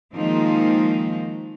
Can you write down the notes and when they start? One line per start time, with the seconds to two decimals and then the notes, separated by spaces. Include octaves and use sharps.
0.14 D#3 F3 G#3 A#3 C4 D#4